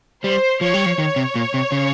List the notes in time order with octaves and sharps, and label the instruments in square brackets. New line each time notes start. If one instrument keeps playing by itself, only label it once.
[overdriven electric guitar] G3 [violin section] C5
[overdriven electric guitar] F3 [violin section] C#5
[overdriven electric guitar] G3
F3
[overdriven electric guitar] D#3 [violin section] C#5
[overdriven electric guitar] C3
A#2
C3
C#3